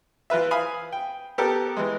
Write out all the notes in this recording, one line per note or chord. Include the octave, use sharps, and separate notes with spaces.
E3 F4 B4 E5
F5 G#5 B5 D#6
G5
B3 G4 A4 A#4
E3 G#3